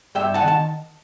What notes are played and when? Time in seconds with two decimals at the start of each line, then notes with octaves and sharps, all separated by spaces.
0.15 G2 E5 G5
0.34 F#5 A5
0.42 D#3
0.48 A5